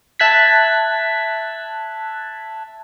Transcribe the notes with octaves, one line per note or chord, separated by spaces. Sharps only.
E5 A5 F#6 G#6 B6